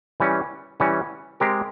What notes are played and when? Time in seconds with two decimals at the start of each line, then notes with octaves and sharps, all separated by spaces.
0.20 E3 G3 C#4
0.80 E3 G3 C#4
1.40 G#3 C4 G4 A#4